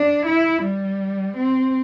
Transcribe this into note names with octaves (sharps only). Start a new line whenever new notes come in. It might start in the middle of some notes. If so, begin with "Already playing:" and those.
Already playing: D4
E4
G3
C4